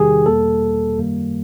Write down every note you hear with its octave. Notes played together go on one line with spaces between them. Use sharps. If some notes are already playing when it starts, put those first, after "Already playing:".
Already playing: E2 C3 D#3 G3 G4 G#4
E2 B2 G3 A#3 A4
F#2 D#3 G3 A#3